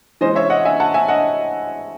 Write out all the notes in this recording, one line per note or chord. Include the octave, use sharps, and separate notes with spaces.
E3 G#3 C#4 C5 D#5
C#5 E5
D#5 F#5
E5 G#5
F#5 A5
E5 G#5
D#5 F#5